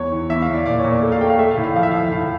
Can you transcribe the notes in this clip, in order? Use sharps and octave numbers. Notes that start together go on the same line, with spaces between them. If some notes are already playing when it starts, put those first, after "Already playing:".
Already playing: E2 C#5
E3
E2 E5
F5
E2
D5
A#2 D5
C#5
A#2
D5
A3
F5
A3 G5
F5
A3 E5
F5
A2
F5
F3 F5
E5
F3 F5
A2 F5